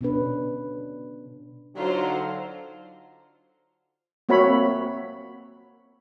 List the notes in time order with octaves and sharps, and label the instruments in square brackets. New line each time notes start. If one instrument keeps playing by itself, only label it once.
[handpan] B2 C#4 D4 B4
[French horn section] D3 F#3 D#4 [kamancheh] F4 C5
[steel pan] A#3 C4 F#4 C#5 E5 B5